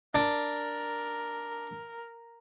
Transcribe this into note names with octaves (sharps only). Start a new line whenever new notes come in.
D4 A#4